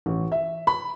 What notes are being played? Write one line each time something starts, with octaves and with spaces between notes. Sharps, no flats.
A1
E5
B5